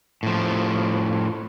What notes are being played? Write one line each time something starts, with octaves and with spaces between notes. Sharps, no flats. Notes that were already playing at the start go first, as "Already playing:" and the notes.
A2 F3